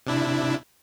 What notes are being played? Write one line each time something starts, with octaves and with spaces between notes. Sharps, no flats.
C3 D4 E4